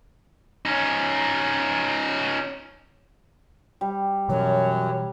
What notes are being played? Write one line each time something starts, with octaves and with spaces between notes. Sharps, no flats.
C#4 D#4
G3
F#2 B2 E3 F#3 C#5